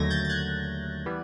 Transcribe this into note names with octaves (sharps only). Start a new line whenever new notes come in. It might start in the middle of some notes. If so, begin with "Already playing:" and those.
Already playing: D#2 D3 F#3 A3 G#6 A#6
G6 A6
A6
F#6 G#6
E3 G3 B3